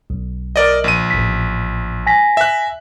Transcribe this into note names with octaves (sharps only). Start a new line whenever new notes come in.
B1
A#4 D5 D#5
A#1 D#7
A1 B6
G#5 A#6 B6
E5 F#6